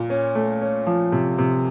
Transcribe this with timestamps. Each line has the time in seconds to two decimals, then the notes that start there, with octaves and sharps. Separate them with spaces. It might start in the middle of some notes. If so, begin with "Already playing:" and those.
Already playing: A#2
0.10 C#4
0.35 A3
0.61 C#4
0.86 F3
1.12 C3
1.38 C3